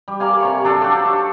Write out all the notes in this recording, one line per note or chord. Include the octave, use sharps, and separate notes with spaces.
G3
A#4 D5 F5 G#5
C3 C#5 C#6
F#3 D4 A4
D4 G4
C#6